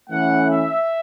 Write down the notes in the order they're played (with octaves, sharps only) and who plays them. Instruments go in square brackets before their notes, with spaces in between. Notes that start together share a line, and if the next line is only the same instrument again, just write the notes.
[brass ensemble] E3 A3 C#4 F#5
E5